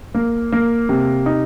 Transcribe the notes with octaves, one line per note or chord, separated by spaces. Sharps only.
A#3
A#3
C3
D#4